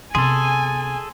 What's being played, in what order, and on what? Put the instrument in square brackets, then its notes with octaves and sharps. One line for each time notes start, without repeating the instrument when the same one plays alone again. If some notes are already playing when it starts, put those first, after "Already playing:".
[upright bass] C3 B3 [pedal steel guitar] G#4 A4 [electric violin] G#5 [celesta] C6